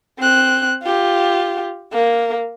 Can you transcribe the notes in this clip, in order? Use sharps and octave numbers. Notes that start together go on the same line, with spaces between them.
C4 F#6
F4 G4
A#3